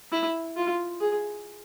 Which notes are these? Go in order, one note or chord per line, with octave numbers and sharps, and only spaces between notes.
E4
F4
G#4